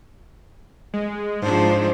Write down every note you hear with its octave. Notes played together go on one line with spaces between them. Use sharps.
G#3
G#2 F3 D4 C5